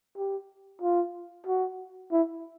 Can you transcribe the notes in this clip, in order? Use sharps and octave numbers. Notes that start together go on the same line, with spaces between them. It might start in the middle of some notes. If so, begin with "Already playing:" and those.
G4
F4
F#4
E4